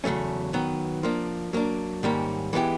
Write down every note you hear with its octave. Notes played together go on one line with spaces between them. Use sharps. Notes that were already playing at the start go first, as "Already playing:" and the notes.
E2 C#3 F#3 A3 C#4
D#3 F#3 B3
F3 A#3 D4
F#3 A#3 D4
G#2 D#3 G3 A#3 C#4
E3 G#3 B3 E4 G4